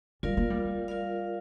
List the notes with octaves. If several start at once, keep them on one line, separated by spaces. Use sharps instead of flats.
G3 F4 A#4 D5 F5
A#3
G3
F4 A#4 D5 F5